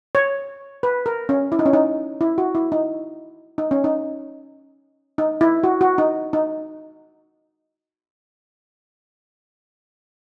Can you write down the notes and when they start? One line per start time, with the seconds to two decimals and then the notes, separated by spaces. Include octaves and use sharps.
0.15 C#5
0.83 B4
1.06 A#4
1.29 C#4
1.52 E4
1.59 D#4
1.66 C#4
1.73 D#4
2.21 E4
2.38 F#4
2.55 E4
2.72 D#4
3.58 D#4
3.71 C#4
3.84 D#4
5.18 D#4
5.41 E4
5.64 F#4
5.81 F#4
5.98 D#4
6.33 D#4